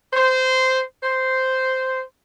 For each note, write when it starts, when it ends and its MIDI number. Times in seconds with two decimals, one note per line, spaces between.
0.13 0.81 72
1.03 2.01 72